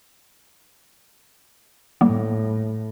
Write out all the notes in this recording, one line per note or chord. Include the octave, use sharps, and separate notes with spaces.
A2 G3 A#3 B3